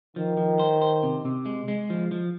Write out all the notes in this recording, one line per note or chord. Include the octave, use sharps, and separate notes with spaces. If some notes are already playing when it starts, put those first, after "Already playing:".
D#3 F3
F3
C5
C5
C3
C3
G#3
G#3
F3
F3